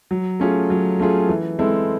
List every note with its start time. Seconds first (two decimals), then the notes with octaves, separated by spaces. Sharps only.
0.11 F#3
0.40 A3 C#4 F4 G#4
0.70 F#3
0.99 A3 C#4 F4 G#4
1.29 E3
1.59 G#3 C4 E4 A4